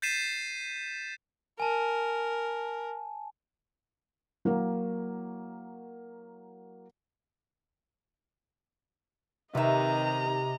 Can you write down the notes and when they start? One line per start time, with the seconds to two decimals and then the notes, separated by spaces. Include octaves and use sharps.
0.02 G6 A6 B6 C7 D#7 E7
1.60 A#4 G#5 A5
4.45 F#3 A#3 E4 A#4
9.55 C3 D#3 B4 D#5 E5 A#5